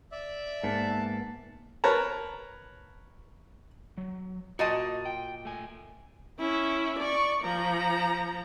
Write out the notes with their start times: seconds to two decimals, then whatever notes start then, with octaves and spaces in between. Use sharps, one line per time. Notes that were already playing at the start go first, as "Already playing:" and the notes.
0.12 D5 E5
0.63 G#2 A#3 B3 A5
1.84 A#4 B4 C#5 A5 A#5
3.97 F#3
4.59 A#2 F#4 D#5 A5
5.06 G5
5.45 A3 G#5
6.39 C#4 E4
6.99 D5 C#6
7.44 F3 A#5